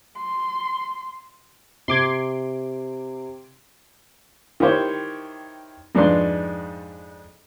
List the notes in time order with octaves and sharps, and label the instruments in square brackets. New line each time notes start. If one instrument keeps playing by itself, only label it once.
[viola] C6
[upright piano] C3 [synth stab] C6 D6 G#6
[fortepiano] D#3 E4 G4 C5 C#5
F2 G#2 G#3 D4 B4 C6